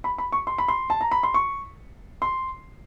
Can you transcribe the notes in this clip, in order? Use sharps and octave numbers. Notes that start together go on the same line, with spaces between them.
B5
B5
C#6
C6
B5
C6
A5
A#5
B5
C6
C#6
C6